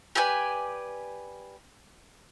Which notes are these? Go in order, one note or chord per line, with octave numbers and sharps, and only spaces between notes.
G4 B4 D5 G#5